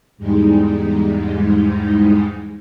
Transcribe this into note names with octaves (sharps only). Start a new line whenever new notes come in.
E2 G#2 G3 G#3 D#4